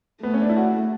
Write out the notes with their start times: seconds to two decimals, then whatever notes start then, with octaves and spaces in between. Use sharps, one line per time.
0.23 A3 B3
0.34 C#4
0.42 D4
0.49 E4
0.57 F#4